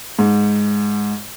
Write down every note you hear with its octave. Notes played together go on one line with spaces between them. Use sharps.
G#2